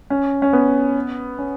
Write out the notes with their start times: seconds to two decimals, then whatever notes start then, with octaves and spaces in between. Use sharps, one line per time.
0.10 C#4
0.42 C#4
0.53 B3
1.39 C#4